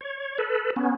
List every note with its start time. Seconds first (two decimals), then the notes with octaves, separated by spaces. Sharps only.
0.01 C#5
0.38 A4 B4
0.76 B3 C#4